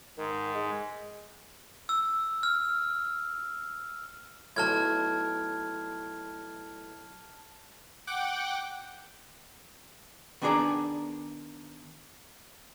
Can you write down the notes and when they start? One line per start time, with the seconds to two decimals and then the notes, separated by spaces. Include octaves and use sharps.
0.18 G#2 D#3
0.55 G#3
1.89 E6
2.43 F6
4.56 B1 A2 A5 F6 G#6
8.07 F#5 G5 D6
10.42 D#3 B3 D4 G#4 D5 A#5